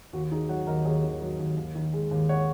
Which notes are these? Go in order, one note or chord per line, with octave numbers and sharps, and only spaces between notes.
D#2 F#4
D#3 D#4 G#4
F#3 C#5 F#5
D#2 A#4 D#5
D#2 G#4 C#5
D#3
F#3
D#2
D#2
D#3
G#3
D#2
C#5 F#5